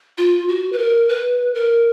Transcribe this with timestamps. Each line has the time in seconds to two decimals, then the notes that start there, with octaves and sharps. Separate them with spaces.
0.18 F4
0.48 F#4
0.73 B4
0.78 A#4
1.09 B4
1.55 A#4